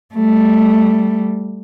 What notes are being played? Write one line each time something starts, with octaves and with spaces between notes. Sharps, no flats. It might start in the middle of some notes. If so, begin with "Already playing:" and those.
G3 A3